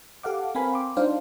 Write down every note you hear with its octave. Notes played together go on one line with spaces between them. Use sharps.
G4 A4 F5 F#5 D6
C4 A#4 B4 F5 G#5 B5
G5 C6 D6
G3 D4 D#4 F4 C5 F5